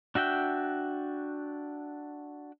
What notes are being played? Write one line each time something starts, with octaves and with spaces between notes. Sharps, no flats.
D4 F#4 E5 G5